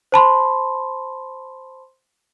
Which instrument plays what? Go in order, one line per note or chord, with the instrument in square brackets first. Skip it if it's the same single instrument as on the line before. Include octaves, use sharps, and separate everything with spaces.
[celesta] C5 A5 B5 C6